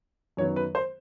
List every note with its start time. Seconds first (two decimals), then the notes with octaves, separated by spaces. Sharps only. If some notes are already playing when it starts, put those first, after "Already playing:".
0.37 F#2 D#3 F#3 B3 C#5
0.56 B4
0.75 C5